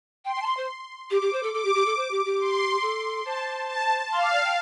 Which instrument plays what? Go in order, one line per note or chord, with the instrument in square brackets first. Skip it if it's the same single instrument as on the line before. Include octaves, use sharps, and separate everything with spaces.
[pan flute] G5 [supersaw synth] C6
[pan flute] G5
A5
C6
C5
[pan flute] G4 [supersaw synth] D6
[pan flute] G4
C5
A4
[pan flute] A4 [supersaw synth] D6
[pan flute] G4
G4
A4
C5
G4
G4
[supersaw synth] C6
[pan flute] A4
[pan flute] C5 [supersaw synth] A5
[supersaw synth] A5
[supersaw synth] F5 [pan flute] C6
[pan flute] D6
D5
G5